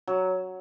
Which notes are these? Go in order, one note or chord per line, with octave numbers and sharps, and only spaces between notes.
F#3